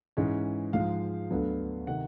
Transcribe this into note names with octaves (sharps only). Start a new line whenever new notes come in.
G#2 E3 G#3 C#4
G#2 F3 G#3 F5
D2 D3 F#3 B3
C3 D#3 F#5